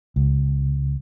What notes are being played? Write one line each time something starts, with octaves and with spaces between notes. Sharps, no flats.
C#2